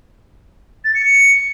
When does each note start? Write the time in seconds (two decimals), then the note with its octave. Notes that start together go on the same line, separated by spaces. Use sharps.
0.85 A6
0.95 C#7
1.05 C#7